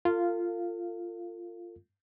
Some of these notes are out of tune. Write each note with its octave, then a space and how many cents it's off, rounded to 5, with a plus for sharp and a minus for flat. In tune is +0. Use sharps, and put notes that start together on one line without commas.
F4 -10 A4 +40 F5 +0